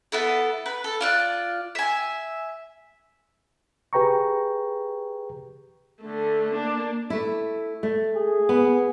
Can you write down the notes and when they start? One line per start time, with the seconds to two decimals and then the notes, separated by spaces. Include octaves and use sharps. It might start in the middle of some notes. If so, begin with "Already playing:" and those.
0.12 B3 E4 A4
0.66 B4
0.84 A4
1.01 F4 D5 F#6
1.75 E5 G#5
3.93 G4 G#4 B4 G5 A#5 C#6
6.02 D3 A3
6.56 A#3 D4
7.10 A3 E4
7.83 A3
8.15 G#4
8.49 B3